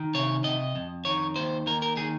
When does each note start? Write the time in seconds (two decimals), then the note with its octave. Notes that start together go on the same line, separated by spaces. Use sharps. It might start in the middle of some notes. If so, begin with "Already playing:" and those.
Already playing: D#3
0.14 C3 C#5
0.44 C3 D#5
0.76 F2
1.05 D#3 C#5
1.36 D#2 C5
1.67 D#2 A#4
1.82 A#4
1.97 D#3 G#4